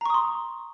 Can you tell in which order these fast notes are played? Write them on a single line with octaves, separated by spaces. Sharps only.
A#5 C#6 D#6 C6